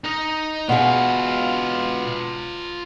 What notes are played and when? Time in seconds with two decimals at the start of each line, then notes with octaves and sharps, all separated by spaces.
0.04 D#4 D#5
0.69 B2 F4 G#4 B4